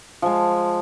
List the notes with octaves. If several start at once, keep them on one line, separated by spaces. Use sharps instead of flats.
F3 G#3